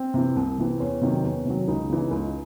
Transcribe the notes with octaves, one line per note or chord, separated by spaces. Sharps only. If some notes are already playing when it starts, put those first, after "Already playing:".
Already playing: C4
C3 E3
C2
C3 E3
E2 C#4
C3 D#3 F#3
E2
C3 D#3 F#3
C#2 D#4
C#3 E3
C#2